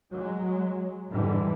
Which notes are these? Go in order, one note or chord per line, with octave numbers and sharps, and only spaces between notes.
F#3 G#3
F2 G#2 D3 E3 G3